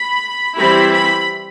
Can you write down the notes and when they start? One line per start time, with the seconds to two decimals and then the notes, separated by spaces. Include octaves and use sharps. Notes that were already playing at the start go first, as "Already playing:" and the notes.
Already playing: B5
0.56 E3 G3 C4 E4 B5
0.92 B5